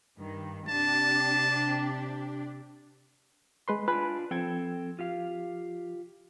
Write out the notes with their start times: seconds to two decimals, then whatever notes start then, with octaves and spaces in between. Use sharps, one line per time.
0.18 G2 D#3
0.68 C3 D4 G4 A5
3.68 G#3 B4 C6
3.88 D4 F4 B4 G#5
4.31 F3 C4 A4 G5 G#6
4.99 F4 G4 F5